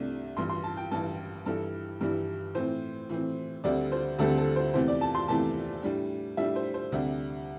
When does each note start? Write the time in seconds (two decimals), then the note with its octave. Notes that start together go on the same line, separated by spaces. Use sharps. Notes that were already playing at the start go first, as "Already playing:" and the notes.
Already playing: C2 C3 A3 D4
0.37 A1 G2 E3 C6
0.49 C6
0.63 A5
0.77 G5
0.91 A1 G2 E3 A5
1.46 G2 E3 G3 E4 A4
2.01 G2 E3 G3 E4
2.55 A2 E3 C4 C5
3.09 A2 E3 C4
3.64 D2 D3 G3 C4 D5
3.92 C5
4.19 D2 D3 G3 C4 A4
4.38 A4
4.56 C5
4.74 E2 C3 A3 E4 C5
4.88 D5
5.01 A5
5.15 C6
5.28 E2 C3 A3 E4 A5
5.83 A2 G3 D4
6.37 A2 G3 D4 E5
6.56 C5
6.74 C5
6.92 D2 C3 G3 D4